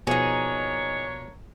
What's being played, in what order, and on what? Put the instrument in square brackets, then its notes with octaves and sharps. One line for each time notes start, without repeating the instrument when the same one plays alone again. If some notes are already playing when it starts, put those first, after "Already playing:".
[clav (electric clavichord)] B2 F3 [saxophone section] A#3 D4 C#5 [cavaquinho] D#4 G#4